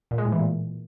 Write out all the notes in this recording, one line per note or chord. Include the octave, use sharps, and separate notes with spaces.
A#2
G#3
A2
E3
A#2